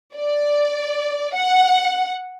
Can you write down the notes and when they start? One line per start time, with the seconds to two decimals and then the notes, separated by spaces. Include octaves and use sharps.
0.15 D5
1.35 F#5